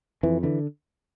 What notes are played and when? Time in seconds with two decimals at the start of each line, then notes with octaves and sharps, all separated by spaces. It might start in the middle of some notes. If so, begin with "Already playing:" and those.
0.23 F2 E3
0.43 D3 E3